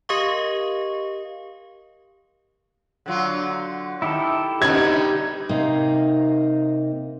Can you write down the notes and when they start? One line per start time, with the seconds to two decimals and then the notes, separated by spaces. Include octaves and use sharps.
0.09 G4 A#4 D#5 F5 C#6
3.06 D3 F#3 F4
4.02 D#3 E4 G4 A4
4.62 B2 D3 G3 D#4 D#5 G#6
5.49 C3 A#3 D#4